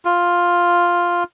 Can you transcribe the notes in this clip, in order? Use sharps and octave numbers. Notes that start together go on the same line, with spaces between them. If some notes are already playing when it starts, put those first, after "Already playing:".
F4